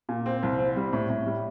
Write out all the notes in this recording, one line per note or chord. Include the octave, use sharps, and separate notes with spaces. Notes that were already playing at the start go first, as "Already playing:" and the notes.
A#2
C4
C2
C4
G3
A2
A2
G3